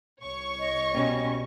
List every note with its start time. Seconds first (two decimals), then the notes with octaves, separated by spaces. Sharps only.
0.21 C2 C#5 C#6
0.59 D#5
0.93 B2 G3 C#4